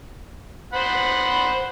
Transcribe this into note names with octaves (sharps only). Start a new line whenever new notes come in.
C5 F#5 B5